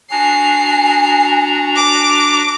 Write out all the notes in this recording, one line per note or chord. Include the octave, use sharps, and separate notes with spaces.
D4 F#4 G#5 A#5 C7
D6